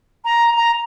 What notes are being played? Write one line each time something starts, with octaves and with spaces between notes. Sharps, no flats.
A#5
A#5